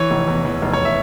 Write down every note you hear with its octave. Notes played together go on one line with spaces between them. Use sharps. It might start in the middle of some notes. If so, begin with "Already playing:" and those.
Already playing: E3 C#5
F1
E2
E2
F1
C#5
E5